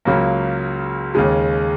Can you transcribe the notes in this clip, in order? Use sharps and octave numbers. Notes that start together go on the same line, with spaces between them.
C#2 C#3 F#3 A#3
D#2 C#3 G#3